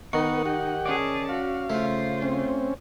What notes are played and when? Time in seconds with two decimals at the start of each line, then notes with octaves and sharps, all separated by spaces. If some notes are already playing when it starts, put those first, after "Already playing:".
0.13 D#3 B3 D#4 A#4 D#5 F#5 C#6
0.46 G4 F#5
0.86 C#4 G#4 D5 A5
1.29 F#4 F5
1.70 C#3 A3 F4 C5
2.22 C4 C#4